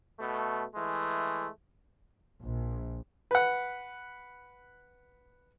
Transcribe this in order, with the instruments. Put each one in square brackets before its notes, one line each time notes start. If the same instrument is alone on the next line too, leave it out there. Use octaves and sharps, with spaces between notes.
[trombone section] B2 A3
E3 G#3 A3
[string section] A#1
[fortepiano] B4 F#5